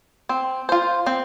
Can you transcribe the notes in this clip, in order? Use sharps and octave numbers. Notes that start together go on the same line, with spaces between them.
C4
F4 C5
C4